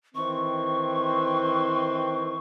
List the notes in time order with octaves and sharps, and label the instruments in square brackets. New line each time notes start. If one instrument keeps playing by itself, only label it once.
[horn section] D#3 E3 C4 [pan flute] C#6